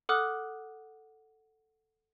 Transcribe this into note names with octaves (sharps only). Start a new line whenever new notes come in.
A4 F#5 D6 D#6 F6 F#6